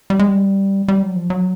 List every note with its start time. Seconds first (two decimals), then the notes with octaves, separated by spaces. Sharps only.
0.10 G3
0.19 G#3
0.28 G3
0.88 G3
1.03 F#3
1.16 F3
1.30 F#3